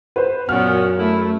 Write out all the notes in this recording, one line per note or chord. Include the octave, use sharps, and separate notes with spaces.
B4 C5
F#2 A#2 B3 C#4 F#4 F6
A3 E4